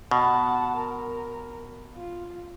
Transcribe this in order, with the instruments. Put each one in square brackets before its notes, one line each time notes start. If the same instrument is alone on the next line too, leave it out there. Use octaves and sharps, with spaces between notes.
[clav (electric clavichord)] B2 [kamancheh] F#5 A5
[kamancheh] A#4
F4